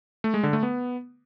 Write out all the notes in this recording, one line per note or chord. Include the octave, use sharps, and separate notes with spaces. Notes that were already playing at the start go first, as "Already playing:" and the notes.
A3
G#3
D3
A3
B3